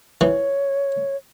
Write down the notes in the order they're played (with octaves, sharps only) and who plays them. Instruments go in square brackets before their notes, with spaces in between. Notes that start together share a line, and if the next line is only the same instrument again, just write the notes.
[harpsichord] E3 [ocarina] C#5